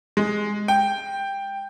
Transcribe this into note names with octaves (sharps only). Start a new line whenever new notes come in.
G#3
G5